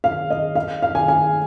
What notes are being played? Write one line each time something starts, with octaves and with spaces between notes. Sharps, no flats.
F5
D#5
F5
F5
G#5
G#5